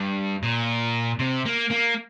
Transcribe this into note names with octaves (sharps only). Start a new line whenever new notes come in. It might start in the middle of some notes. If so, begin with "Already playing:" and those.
Already playing: G2
A#2
C3
A#3
A#3